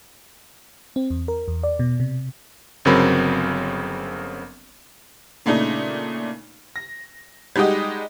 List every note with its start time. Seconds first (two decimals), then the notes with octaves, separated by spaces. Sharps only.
0.96 C4
1.10 E2
1.28 A#4
1.48 E2
1.63 D5
1.79 B2
2.00 C3
2.85 G1 C#3 F#3 C4 A#4 B5
5.46 A#2 C#3 A3 D4 D#4
6.76 A#6
7.56 G3 G#3 D#4 F#4 G4 D#5